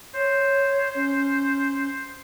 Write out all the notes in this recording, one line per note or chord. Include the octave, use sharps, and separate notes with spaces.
C5 C#5
C#4